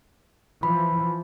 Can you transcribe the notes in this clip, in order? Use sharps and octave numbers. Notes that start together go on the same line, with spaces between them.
E3 F3 B5